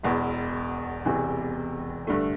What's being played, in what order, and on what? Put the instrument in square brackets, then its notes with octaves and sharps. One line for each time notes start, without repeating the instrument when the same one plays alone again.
[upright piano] E1 E2 B2
E1 E2 C3 E3
G2 D3 A3